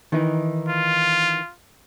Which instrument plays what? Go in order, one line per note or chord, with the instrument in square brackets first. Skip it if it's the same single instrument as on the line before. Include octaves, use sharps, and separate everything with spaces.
[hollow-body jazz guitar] D#3 E3 D#4
[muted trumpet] F4